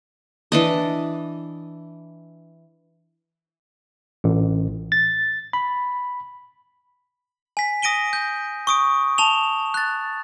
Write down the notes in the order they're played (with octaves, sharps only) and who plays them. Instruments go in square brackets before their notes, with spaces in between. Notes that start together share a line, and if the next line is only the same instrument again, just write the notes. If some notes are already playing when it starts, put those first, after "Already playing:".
[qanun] E3 D4 D#5
[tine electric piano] A1
A6
B5
[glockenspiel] G#5 B6
D#6 A#6 D7 D#7 G7
G6
C#6 D#6 D7
A5 E7 F7 G7
F#6 A6